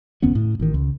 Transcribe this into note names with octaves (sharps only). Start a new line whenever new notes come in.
F#1 D#2 B3 C#4
A2
A1 D#3
C#2